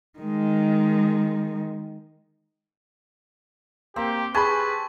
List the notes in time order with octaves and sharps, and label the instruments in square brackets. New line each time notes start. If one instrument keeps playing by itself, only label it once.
[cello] D#3 G#3
[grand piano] A#3 [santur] C4 [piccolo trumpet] G4
[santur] G4 G#5 A5 [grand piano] G#4 B5 [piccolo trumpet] B4 [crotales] C#6